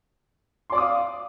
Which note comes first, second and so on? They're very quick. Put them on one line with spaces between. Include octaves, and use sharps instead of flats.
C6 D5 D6 D#6 F5